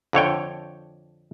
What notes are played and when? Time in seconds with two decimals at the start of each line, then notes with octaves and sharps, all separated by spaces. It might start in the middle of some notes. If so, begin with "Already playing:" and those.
0.13 F2 D3 C#5 G5